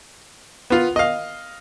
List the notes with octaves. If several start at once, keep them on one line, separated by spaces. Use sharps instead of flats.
B3 F4
D#5 F5